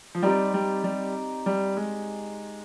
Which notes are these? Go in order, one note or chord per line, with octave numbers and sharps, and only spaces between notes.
F3
G3 C4 D#4 G4 D5
G3
G3
G3
G#3